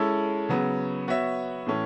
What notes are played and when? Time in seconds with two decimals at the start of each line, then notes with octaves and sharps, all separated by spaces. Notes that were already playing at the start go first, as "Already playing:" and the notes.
Already playing: G#3 C#4 E4 A4
0.49 C#3 F#3 B3
1.08 B3 F#4 C#5 E5
1.67 A2 E3 A3 C#4